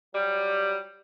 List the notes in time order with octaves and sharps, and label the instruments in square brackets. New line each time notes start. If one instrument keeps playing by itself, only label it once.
[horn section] F#3 G3